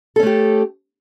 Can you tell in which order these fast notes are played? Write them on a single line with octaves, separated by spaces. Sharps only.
A4 C#4 A3 G4